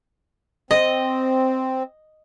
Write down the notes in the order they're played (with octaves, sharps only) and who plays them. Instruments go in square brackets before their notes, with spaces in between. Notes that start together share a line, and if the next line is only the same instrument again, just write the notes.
[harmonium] C4 [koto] D#5